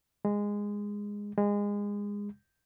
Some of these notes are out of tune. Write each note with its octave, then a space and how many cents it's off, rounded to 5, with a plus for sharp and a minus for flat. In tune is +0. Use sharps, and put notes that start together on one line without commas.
G#3 -15
G#3 -25